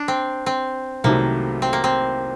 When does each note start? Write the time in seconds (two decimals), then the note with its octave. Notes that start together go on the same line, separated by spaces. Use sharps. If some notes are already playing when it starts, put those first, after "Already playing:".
Already playing: D4
0.08 C4
0.46 C4
1.04 C2 C3 D#3 F#3 A3 A#3
1.62 C4
1.73 A#3
1.84 C4